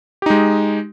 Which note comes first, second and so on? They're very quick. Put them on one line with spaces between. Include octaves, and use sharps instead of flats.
G4 D#4 G#3